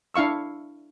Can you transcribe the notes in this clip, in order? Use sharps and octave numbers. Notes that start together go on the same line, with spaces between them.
D4 E4 F5 C#6 E6